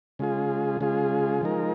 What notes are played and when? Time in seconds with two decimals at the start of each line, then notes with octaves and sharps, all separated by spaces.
0.19 C#3 G#3 F4 G#4
0.80 C#3 G#3 F4 G#4
1.41 F3 G#3 D#4 A#4